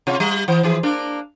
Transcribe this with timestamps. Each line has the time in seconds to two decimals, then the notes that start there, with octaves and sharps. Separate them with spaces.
0.07 C3 F4 C#5
0.20 G3
0.48 E3 C5
0.63 E3 F3 G#4
0.83 A#3 D4 A#4